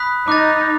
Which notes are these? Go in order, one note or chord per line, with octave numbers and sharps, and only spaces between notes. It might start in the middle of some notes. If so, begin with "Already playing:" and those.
Already playing: B5 D#6 F#6 B6
D#4 D6 F#6 A6